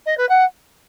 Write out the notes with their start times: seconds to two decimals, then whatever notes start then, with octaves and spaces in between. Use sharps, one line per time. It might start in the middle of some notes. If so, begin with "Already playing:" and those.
0.06 D#5
0.17 B4
0.29 F#5